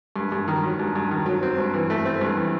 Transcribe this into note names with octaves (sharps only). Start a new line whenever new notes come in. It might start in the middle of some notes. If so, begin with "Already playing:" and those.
G2
G2
D#3
F#3
G2
G2
D#3
F#3
C4
G2
E3
A3
C4
G2
E3